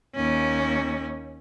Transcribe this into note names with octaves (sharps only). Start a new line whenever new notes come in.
D#2 C#4